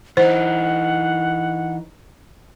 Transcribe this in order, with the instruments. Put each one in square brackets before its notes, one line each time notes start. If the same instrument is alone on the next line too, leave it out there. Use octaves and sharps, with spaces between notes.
[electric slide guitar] E3 D#4 [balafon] C5 [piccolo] F#5